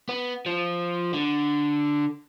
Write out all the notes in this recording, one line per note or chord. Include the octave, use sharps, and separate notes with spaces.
B3
F3
D3